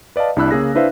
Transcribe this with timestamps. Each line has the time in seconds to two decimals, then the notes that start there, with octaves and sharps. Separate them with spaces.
0.16 B4 D5 D#5 F5 A5
0.36 C2 D4 E4 B5 E6 F#6
0.51 C#3 A#3 G#4 A#6
0.75 D4 E4 B4 C5 E5 F5